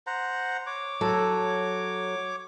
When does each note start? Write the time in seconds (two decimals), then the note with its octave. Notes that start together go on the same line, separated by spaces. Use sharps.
0.07 C5 F#5 A#5
0.66 C#5 D6
1.01 F#3 A4